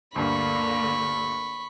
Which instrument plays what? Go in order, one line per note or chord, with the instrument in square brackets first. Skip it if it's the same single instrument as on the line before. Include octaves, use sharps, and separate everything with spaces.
[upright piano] D2 G2 [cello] D3 A#3 [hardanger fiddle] B5 C#6